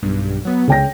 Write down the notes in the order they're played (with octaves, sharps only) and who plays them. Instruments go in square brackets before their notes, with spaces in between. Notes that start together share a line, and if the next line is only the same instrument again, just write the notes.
[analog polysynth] B1 G2
F#3 B3
[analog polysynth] C#2 [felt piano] C#3 G5 A#6